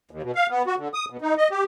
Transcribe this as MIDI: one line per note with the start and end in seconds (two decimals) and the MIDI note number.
0.11 0.22 39
0.22 0.31 47
0.35 0.46 77
0.50 0.62 59
0.66 0.75 66
0.78 0.88 50
0.94 1.05 87
1.10 1.17 47
1.22 1.34 63
1.38 1.48 75
1.51 1.64 67